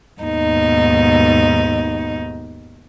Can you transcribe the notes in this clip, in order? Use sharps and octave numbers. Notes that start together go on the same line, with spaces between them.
D#2 G#2 B2 D#4